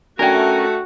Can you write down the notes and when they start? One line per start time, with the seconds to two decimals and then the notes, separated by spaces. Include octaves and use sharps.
0.19 A3 C#4 D4 F#4 A#4 D5 G5